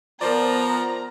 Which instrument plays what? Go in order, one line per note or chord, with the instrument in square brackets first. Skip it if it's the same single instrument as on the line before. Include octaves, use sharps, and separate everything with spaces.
[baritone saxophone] F3 [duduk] B3 [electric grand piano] A#4 C5 D5 [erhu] A#5